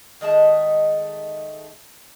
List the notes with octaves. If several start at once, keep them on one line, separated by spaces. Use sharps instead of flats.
D#3 G#3 A3 A5